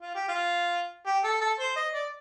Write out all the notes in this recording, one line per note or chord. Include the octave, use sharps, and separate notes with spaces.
F4
G4
F4
G4
A4
A4
C5
D#5
D5